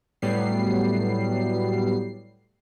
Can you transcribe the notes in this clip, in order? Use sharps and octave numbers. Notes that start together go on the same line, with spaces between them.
A2 F#3 G3 B3 C7